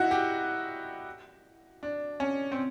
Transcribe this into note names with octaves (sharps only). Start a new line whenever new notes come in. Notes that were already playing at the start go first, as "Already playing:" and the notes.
Already playing: D#4 E4 F#4
G4
D4
C#4
C4